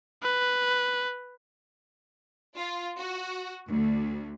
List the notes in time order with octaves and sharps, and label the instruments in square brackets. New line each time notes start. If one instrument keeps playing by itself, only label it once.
[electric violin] B4
[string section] F4
F#4
D2